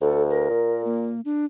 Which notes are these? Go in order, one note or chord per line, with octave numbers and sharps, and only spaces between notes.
D2 A4
A#4
A#2
A#3
D4